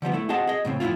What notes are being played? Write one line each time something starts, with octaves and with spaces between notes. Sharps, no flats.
D3 F3 G3 B3
A3 E4
C4 F#4 G#4 D#5 F#5 A5
G#4 D#5
A2 C#3 C4
F2 A2 D#3 E4 F4